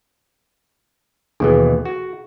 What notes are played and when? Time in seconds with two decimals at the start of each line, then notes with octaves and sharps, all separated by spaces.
1.40 D#2 B2 E3 D4 G#4 A4
1.85 F#4